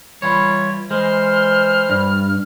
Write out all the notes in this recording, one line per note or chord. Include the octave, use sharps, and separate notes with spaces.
E3 G3 F4 C#5 G#6
E3 G#3 C5 F6
G2